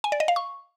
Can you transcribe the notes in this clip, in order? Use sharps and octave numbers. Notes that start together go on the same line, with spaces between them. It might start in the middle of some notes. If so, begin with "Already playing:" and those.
G#5
D5
D#5
F5
C#6